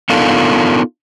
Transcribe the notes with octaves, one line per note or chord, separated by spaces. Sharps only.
B3 D4 D#4 F4 A4 A#4